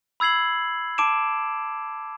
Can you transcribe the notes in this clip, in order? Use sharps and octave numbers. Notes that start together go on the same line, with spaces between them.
B5 E6 G#6 C7 F#7
A5 D6 D7 E7